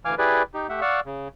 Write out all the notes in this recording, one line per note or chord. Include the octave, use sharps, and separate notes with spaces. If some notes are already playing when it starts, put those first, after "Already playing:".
D2 E3 F5 G#5 D6 F6
E4 G4 G#4 B4 D5
D#4 G4
A3 G4 E5 F#5
D5 F5 F#5 C#6 E6
C#3